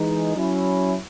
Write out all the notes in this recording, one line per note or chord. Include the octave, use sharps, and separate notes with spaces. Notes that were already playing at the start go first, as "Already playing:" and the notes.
Already playing: E3 G#3 D#4
F#3 C#4 E4